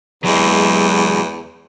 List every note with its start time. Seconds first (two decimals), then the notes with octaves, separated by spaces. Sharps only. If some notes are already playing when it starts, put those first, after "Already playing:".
0.24 E2 F#3 G#3